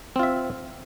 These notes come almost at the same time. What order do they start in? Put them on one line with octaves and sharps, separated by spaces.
C4 F4 E5